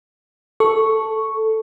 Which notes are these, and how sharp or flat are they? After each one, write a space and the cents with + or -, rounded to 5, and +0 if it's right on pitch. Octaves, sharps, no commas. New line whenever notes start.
A4 +0 C#6 +0